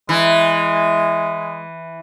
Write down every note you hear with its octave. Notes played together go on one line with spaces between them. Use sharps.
E3 G#3